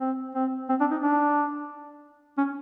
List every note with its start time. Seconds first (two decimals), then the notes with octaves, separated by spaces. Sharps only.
0.01 C4
0.35 C4
0.69 C4
0.80 D4
0.91 D#4
1.03 D4
2.38 C#4